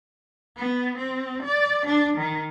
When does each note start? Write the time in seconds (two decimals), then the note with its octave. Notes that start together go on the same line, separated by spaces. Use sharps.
0.57 B3
0.98 C4
1.43 D5
1.86 D4
2.17 D#3